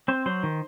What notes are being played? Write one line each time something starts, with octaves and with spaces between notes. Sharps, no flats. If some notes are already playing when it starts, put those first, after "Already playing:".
C4 C5
F#3 C5
D#3